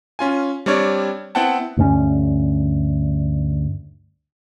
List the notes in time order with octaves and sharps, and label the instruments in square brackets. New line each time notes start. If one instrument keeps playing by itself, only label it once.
[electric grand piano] C#4 F4 G#5
G3 C4 D4 C#5 D5
B3 C4 E4 F#5 G5 A5
[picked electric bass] D2 G2 G3 C#4